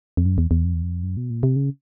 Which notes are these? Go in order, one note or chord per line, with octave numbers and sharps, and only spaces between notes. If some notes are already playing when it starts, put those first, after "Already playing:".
F2
F#2
E2
E2
F2
E2
F2
F#2
B2
A#2
C3
C#3